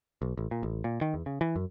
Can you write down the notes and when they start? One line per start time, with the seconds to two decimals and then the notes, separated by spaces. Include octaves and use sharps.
0.22 B1
0.37 A1
0.51 A#2
0.63 A1
0.84 A#2
1.01 D#3
1.14 E2
1.26 C#3
1.41 E3
1.56 F#2